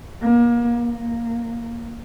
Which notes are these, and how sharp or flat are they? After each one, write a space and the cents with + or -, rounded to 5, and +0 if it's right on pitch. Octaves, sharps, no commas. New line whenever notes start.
A#3 +30
A#3 +0